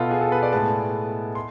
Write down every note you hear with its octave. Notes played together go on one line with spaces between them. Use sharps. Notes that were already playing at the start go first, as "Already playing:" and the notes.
Already playing: B2 B3 F4 A4
G#4
A4
B4
D5
A2 G#3 B3 A5
C6